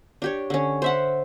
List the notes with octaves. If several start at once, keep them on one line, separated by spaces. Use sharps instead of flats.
D4 G4 C#5
D3 C#4
C5 E5 F#5